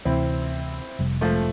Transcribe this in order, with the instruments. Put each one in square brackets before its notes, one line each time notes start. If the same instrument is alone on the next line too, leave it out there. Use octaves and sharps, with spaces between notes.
[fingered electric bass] D2 C3 E3 [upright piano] C4 E4
[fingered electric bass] F1 F2 C3 G3
[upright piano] F3 A3